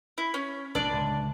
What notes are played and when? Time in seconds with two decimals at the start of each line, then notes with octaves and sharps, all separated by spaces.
0.18 E4
0.34 C#4
0.75 A1 B2 D4 D5
0.92 C#2 A2 D3